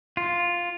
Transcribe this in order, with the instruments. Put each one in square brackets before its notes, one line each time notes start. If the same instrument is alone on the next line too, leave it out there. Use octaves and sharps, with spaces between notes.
[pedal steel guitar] F4